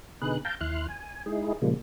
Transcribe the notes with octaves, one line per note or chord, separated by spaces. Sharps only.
B2 D3 D#4 G#4 B4 F#6
F5 G5 A5 A#5 G6
D#2 E4 C6 F6 F#6
G#5
G#3 D#4 E4 G#4
A#2 C#3 F3 G3 G#3 A#3